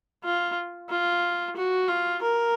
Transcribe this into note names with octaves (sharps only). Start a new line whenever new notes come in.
F4
F4
F#4
F4
A#4